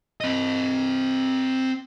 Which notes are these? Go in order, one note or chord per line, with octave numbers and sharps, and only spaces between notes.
C4 D#5